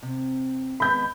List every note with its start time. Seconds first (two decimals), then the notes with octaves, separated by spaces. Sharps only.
0.03 C3
0.80 D#3 G#3 B3 B5 G6